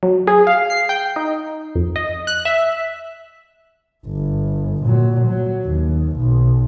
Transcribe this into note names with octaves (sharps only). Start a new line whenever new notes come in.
F#3
G#4
F5
C7
G5
D#4
F2
D#5
F#6
E5
G1
A#2 F#3
F#3
D#2
B1